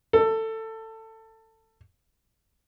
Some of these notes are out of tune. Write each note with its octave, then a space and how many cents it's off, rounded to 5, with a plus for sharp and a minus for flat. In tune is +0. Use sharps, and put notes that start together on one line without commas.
A4 +20